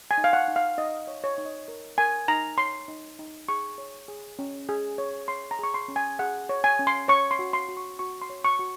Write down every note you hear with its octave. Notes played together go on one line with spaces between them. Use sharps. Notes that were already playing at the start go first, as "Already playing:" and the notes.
G#5
D#4
F5
F#5
D#4
F5
D#4 D#5
C#5
C#5
D#4
D#5
A#4
A#4 G#5
D#4 A#5
C#5 C6
D#4
D#4
G#4 C#6
C#5
G#4
C#4
G#4
C#5
C#5 C6
A#5
G#4 C#6
C6
C#4
G#5
G#4 F#5
C#5
G#5
C#4
C6
C#5 C#6
C6
F#4
C6
F#4
C#6
F#4 C#6
C6
C#5
C#6
F#4